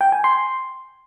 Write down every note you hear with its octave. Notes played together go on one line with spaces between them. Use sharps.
G5
G#5
C6